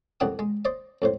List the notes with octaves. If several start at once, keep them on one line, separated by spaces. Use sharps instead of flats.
C2 F2 D4 G4 F#5 D#6
G#3
C5 D5 D#5
F2 A2 C5